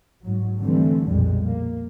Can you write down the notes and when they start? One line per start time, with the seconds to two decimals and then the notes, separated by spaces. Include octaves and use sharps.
0.21 G#2 F#3
0.60 D3 E3 G3 A3 C4
1.07 B1 F2 A#2 G3 G#3
1.43 A#3